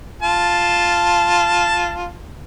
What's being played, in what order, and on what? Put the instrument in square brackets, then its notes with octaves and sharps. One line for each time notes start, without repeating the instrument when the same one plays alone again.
[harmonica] F4 A5